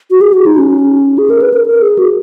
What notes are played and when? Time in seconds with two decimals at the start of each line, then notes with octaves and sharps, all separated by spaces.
0.11 F#4
0.21 G#4
0.33 F#4
0.46 D#4
0.58 C#4
1.18 G#4
1.30 A#4
1.42 B4
1.54 A#4
1.66 A#4
1.82 G#4
1.98 F#4